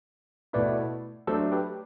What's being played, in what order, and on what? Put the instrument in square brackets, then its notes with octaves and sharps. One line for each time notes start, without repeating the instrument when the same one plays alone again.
[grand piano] B2 A3 E4 [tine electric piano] B4 D5
[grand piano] F#3 A3 D4 [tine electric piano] A4 C5
[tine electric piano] G4 B4